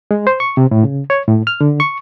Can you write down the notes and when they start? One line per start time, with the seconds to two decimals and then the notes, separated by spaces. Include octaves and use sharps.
0.11 G#3
0.27 C5
0.40 C#6
0.57 C3
0.71 A2
0.84 C#3
1.10 C#5
1.28 A2
1.47 F6
1.61 D3
1.80 C#6